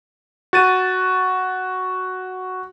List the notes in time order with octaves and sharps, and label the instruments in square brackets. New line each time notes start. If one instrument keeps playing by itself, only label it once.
[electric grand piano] F#4 A6 D#7